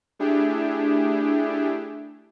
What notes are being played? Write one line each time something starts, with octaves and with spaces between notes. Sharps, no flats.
A3 D4 E4 G4 G#4